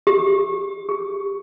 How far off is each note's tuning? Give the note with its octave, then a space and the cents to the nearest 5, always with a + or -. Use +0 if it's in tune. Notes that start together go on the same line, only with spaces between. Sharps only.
G4 +5
G4 +20